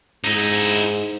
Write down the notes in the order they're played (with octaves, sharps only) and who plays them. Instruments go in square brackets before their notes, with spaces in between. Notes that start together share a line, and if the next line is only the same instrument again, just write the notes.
[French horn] G#2 [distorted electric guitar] D#4 E4